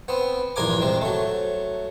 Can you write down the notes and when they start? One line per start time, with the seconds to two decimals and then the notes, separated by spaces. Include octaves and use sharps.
0.08 B3 C4
0.56 A#1 E2 G2 A#4 G#5 D6
0.81 C3 G#3 C4
1.02 F#3 A3